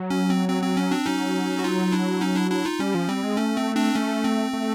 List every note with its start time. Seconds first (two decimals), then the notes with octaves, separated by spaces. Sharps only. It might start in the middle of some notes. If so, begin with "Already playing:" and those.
Already playing: F#3
0.10 C#4
0.30 C4
0.48 C4
0.63 C4
0.77 C#4
0.91 C4 D4
1.06 F#3 C#4 D#4
1.59 F#4
1.64 D#4 F4
1.92 D4 E4
2.21 C#4 D#4
2.36 D4 E4
2.51 D4 E4
2.65 D#4 F4
2.79 G3 C#4
2.95 F3
3.09 G3 C4
3.23 G#3
3.37 A3 C#4
3.57 C4
3.75 C4 D4
3.95 A3 C#4
4.24 C4
4.53 A3